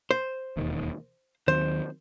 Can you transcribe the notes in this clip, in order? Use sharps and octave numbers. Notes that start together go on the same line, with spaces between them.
C5
E1 D#2 D#3
D#2 D#3 F#3 C4 C5